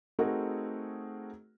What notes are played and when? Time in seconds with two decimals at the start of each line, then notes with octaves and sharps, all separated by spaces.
0.19 A3 C4 D#4 F#4 G#4 A#4